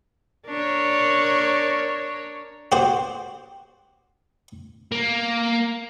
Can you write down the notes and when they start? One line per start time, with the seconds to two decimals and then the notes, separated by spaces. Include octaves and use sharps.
0.47 D4 A#4 C#5
2.72 F#4 G4 C5
4.92 A#3